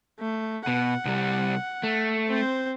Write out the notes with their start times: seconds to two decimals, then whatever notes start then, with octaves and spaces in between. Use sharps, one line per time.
0.20 A3
0.67 B2 F#5
1.05 C2 G3
1.83 A3
2.28 C4 C5